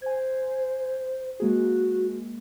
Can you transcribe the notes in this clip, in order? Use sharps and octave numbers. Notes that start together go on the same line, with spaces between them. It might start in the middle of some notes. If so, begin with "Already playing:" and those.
C5 G#5 G#6
G#3 A#3 F#4 G#4